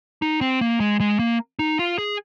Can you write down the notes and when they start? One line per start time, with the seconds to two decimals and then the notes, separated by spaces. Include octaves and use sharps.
0.22 D#4
0.41 C4
0.61 A#3
0.80 G#3
1.00 G#3
1.19 A#3
1.59 D#4
1.79 F4
1.98 G#4